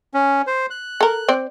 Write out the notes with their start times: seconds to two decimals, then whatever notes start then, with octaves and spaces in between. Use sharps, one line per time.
0.14 C#4
0.47 C5
0.70 F#6
1.01 A4 A#4
1.28 C4 C5 D5